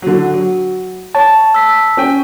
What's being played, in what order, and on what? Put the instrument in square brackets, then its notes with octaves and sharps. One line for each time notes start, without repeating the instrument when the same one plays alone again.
[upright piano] D3 F#3
F#3
[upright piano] C#5 [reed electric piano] A5
[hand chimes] E6 B6
[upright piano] C#4 G5